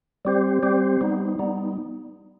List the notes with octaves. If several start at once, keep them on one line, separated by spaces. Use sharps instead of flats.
G3 C4 G4 C5
G3 C4 G4 C5
G3 B3 D#4
G3 B3 D#4